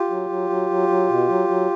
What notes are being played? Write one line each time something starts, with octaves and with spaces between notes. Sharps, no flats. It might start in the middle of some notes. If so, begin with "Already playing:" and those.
Already playing: F4 G4
F#3
F#3
F#3
F#3
F#3
B2
F#3
F#3